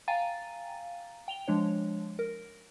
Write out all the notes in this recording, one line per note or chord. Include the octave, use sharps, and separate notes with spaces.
F5 G5 G#5 A#5 A6 D#7
G5 F7 G7
F3 G#3 D4 C#5
A#4